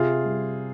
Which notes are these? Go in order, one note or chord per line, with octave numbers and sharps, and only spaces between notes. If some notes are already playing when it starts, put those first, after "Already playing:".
Already playing: C3 F4 G#4
G3